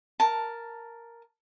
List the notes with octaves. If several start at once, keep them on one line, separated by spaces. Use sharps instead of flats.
A#4 A5